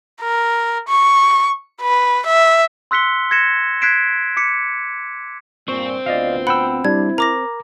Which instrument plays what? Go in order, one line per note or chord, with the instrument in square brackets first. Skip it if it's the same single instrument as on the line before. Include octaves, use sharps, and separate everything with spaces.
[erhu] A#4
C#6
B4
E5
[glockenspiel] C6 E6 F#6 B6 C#7 G7
G#6 A#6 C#7 E7
F#6 G#6 B6 C7 D7 E7
D6 B6 C#7
[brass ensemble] G2 A#2 [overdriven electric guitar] C4 C5 [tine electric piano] C#6
[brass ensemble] D2 B3 F4 [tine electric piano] D5 D#5 F5
[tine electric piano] F#5 G5 E6 [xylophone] B5
[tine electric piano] G3 D4 [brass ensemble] E4 [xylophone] G#6
[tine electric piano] A#4 [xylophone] A#5 D6 A#6